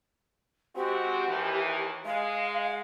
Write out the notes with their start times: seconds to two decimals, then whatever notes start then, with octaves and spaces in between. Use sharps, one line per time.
0.76 G#3 C4 F#4 G4
1.27 D#2 E3
2.05 G#3 F5